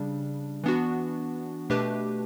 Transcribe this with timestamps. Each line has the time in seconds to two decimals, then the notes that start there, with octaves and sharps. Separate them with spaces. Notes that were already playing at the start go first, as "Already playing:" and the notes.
Already playing: C#3 G3 D4
0.64 E3 B3 D4 F#4
1.70 B2 A3 D4 G4 B4